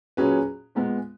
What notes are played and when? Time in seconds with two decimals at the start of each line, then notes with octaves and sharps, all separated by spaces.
0.17 A#2 F#3 C#4 G#4 B4
0.75 A#2 G#3 B3